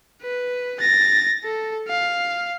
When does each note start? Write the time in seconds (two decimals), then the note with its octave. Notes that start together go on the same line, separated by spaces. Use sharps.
0.22 B4
0.80 A6 A#6
1.44 A4
1.88 F5